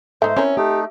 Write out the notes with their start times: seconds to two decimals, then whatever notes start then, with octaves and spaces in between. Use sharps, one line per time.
0.22 G#2 A3 B3 D#4 C5 E5
0.37 C4 C#4 E4 A#4
0.57 A3 D#4 G4